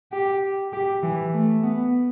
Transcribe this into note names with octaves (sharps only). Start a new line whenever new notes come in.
G4
G4
E3
A3
B3